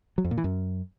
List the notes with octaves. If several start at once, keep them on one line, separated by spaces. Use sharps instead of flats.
F#3
F2
A#2
E3
F#2